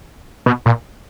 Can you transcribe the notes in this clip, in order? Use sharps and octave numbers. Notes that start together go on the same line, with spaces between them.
B2
A#2